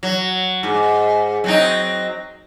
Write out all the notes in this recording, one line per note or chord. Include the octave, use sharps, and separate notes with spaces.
F#3
G#2
F#3 C4 D#4